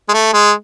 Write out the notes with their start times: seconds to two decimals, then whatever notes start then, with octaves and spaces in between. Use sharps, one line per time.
0.09 G#3
0.13 A3
0.33 G#3